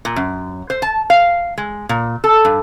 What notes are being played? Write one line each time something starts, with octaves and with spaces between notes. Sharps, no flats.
A#2
F#2
C5
A5
F5
G#3
A#2
A4
G2